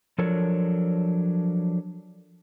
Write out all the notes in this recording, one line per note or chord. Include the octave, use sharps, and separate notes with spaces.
F3 F#3 D4 A4 A#4 C#5